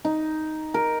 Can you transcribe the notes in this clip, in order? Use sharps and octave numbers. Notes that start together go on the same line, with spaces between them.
D#4
A#4